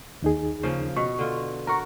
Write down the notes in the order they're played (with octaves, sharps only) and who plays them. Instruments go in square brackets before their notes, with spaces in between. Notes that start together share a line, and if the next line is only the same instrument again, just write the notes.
[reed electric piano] D#2 D#4 G#4
[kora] C#3 F3 A#3
[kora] B2 [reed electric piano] C#6
[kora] D3 F4
[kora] F#4 A#4 [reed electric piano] A#5 C#6